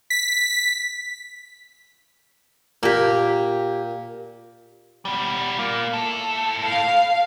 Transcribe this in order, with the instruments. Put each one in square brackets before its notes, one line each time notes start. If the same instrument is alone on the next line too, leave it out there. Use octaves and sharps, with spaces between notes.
[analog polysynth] B6
[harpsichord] A#2 [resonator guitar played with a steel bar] A#3 G4
[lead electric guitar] B2 G3
A#3 F4
A2 A4
[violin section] F5